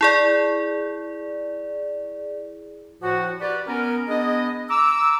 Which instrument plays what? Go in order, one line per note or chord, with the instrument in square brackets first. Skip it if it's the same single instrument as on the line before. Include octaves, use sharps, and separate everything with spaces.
[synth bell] E4 G#4 D5
[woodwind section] A2 F3 F#4
F#4 G4 B4 D5
B3 C#4 A#4
B3 D4 G#4 D#5
A#5 D6 E6